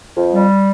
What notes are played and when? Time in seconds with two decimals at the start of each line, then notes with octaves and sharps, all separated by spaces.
0.16 F2
0.33 G3